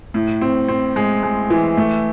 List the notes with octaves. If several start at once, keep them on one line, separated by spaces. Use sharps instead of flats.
A2
C4
C4
G#3
G#3
E3
A3